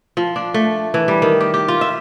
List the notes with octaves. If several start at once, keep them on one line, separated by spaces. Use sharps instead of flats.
F3
D4
A3
E3
G3
D#3
G4
G4
F4
E5